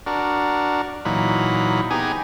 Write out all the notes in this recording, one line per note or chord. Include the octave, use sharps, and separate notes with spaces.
D4 F#4 A#4
A#2 E3 F#3 D#4 B5
B3 D#4 G4 G#4 G#5 A#5